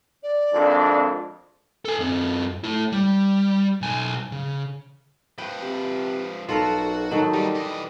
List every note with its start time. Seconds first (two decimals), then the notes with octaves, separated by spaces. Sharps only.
0.22 D5
0.53 G#1 F2 D4
1.85 A4 G#5
1.99 F#2 C4
2.64 A3 E4
2.92 G3
3.81 B1 G#5
4.32 C#3
5.38 F3 B4 G5
5.62 C3
6.49 B1 F4 F#4 A4 A#4
7.11 D#3 F#3 D#4 A4
7.33 G3 D#4 G4
7.55 E3 D#5